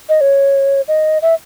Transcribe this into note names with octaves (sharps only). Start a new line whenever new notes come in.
D#5
C#5
D#5
E5